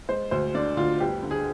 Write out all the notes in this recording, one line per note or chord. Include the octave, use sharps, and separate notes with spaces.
G#3 C5
D2 C5
D3 D5
D2 F4
G1 G4
D3
G#4